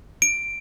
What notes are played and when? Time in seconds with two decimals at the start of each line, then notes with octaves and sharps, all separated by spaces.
0.22 D7